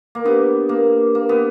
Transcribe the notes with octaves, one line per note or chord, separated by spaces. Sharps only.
A#3
B3 D4 G4 B4
A#3
A#3
B3